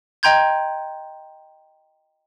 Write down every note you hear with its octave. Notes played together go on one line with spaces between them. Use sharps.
D#5 G5 A#5 C6 G6 G#6